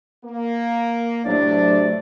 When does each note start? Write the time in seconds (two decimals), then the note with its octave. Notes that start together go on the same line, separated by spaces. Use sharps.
0.24 A#3
1.25 A2 C3 F#3 A3 D4 D5